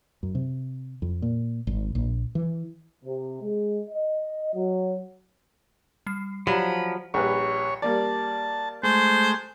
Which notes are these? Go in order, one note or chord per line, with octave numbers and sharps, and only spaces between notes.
F#2
C3
F2
A#2
G#1
A#1
E3
C3
G#3
D#5
F#3
G3 C7
F3 F#3 G4 D5 B5
A#1 G3 B4 C#5
G3 A#3 D5 A5
G#3 A3 C5